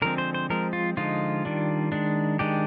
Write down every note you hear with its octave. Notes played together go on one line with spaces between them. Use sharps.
D3 F3 G#3 C4 A#4
C5
C5
F3 G#3 C4 A#4
F4
D3 F3 G#3 D#4 F4
D#3 G3 D4
D#3 G#3 D4
D#3 G#3 D4 G4